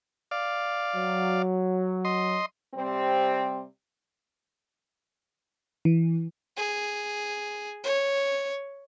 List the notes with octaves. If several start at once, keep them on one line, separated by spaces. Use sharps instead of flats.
D5 F5
F#3
D#5 C6
C3 G3 C4
E3
G#4
C#5